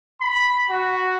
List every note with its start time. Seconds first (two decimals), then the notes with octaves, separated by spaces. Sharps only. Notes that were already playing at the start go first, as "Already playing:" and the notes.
0.21 B5
0.70 F#4